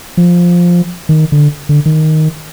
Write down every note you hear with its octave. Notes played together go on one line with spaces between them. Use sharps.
F3
D#3
D3
D3
D#3